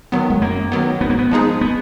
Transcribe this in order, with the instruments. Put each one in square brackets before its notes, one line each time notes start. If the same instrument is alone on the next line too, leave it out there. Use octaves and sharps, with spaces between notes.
[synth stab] D#3 F#3 B3
[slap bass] G#3
[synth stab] F#2 [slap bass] A#3
[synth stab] D#3 F#3 B3
[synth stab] G#2 [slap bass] B3
[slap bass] A#3
B3
[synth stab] F3 G#3 D#4 G#4
[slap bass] B3